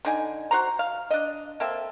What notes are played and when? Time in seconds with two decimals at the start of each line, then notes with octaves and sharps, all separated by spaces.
0.05 D3 D#4 G#5
0.51 F#4 C5 A#5
0.79 F5
1.11 D4 D#5
1.60 A#3 C4 A4 E5